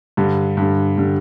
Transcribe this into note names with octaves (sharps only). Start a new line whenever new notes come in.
G2 D3 G3
G2 D3 G3
D3 G3